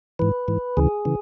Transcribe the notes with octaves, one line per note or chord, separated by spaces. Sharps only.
G#2 E3 B4
G#2 E3
D2 C#3 E3 G#4
C#3 E3